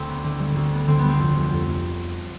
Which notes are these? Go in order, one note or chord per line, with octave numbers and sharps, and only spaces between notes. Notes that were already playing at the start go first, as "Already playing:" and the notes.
Already playing: D2 C4
B3
D3
G3
D2
B3
D3 C4
B3
G3 C4
F1
F1
F2